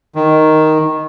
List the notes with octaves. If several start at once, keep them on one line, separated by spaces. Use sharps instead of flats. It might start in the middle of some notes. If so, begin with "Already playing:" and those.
D#3